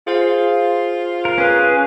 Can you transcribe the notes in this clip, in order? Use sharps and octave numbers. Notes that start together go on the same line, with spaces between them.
F4 G#4 C5 F5
A#4
C#4 G#4 B4